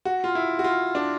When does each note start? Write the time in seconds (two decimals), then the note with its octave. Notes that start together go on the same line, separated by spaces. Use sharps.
0.05 F#4
0.24 F4
0.35 E4
0.59 F#4
0.64 F4
0.95 D4